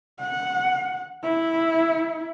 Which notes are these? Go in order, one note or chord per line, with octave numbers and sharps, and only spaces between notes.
F#5
E4